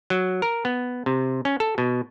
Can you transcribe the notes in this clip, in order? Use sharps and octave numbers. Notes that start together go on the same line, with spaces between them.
F#3
A#4
B3
C3
C#4
A4
B2